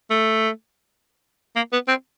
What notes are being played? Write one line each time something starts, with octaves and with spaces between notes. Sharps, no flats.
A3
A#3
B3
C4